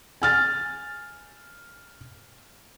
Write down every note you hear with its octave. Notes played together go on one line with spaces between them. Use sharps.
G#5 F6 A6